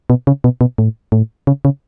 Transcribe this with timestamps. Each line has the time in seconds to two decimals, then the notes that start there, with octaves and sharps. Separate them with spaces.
0.10 B2
0.27 C#3
0.44 B2
0.61 B2
0.78 A2
1.12 A2
1.47 C#3
1.65 C#3